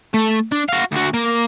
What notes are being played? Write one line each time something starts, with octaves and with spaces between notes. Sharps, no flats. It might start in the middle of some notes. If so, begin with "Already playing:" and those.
A3
D4
F#4 F5
D2 F#4
A#3